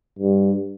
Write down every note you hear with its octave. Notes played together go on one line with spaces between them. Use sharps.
G2